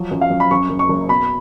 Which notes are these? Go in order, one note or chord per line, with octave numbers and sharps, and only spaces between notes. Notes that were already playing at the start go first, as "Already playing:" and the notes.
Already playing: F3 F#3
F#2
F5
F#2
B5
F#2 C#6
F#1
C#6
F#1
B2 B5